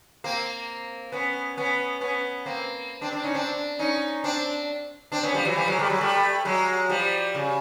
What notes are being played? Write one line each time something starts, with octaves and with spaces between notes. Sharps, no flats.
A#3 C4
B3 C#4
B3 C#4
B3 C#4
A#3 C4
C4 D4
C4 D4
C#4 D#4
C4 D4
C#4 D#4
C4 D4
C4 D4
B3 C#4
F3 G3
E3 F#3
F3 G3
F#3 G#3
G3 A3
F#3 G#3
G3 A3
F#3 G#3
F3 G3
C#3